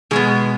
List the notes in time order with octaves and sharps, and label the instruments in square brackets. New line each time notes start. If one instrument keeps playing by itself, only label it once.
[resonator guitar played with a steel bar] B2 G#3 B3 G#4